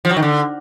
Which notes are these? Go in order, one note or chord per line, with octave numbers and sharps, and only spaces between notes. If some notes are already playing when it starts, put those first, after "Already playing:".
F3
F#3
D#3
D3